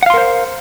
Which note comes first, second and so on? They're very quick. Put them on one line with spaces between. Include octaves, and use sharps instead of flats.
F#5 F5 C6 A#4 C5